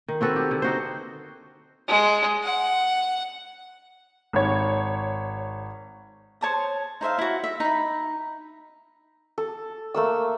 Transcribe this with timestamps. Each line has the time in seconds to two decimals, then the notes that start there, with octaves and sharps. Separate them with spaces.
0.08 D#3
0.21 C4 F#4 A4 B4
0.36 G4
0.51 D3
0.62 D#4 F#4 C5
1.88 G#3
2.43 F#5
4.33 G#1 C#5
6.41 C5 C#5 A5 D#6
7.01 D#4 C5 E5 F5
7.18 E4 F#4
7.44 E5
7.60 D#4 B5
9.38 A4
9.94 A3 A#3 E6